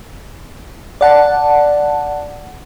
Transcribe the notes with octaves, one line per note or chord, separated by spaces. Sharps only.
D5 F#5 A5